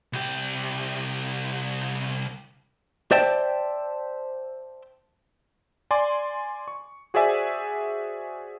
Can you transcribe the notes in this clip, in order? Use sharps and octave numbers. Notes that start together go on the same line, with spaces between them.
C2 G4
C5 D5 E5 G5 A5
D5 G#5 C6 D6
C#6
F#4 G#4 C5 D5 E5 G#5